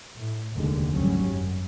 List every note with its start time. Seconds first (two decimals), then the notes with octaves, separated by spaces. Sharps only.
0.18 A2
0.53 F1 D#2 D3 G#3
0.91 G#1 D2 F#3 G3 C#4
1.26 F#2